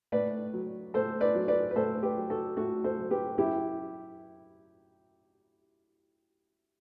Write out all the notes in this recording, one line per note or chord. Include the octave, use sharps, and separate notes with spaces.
A2 B4 D5
F#3
A2 A4 C5
B4 D5
F#3
B4 D5
B4
A2 A4 C5
G4 B4
F#3
F#4 A4
A2 F#4 A4
A4 C5
F#3
G4 B4
F#2 E4 G4